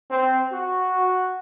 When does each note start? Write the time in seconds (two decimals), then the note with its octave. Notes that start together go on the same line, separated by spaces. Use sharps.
0.11 C4
0.53 F#4